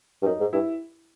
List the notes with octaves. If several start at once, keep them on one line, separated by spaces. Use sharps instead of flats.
G2
F#2 D#4
G#2
G2 E4